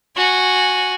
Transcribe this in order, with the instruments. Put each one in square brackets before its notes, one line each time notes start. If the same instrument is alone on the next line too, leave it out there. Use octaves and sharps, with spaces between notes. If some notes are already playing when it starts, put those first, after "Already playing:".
[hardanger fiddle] F#4 G#5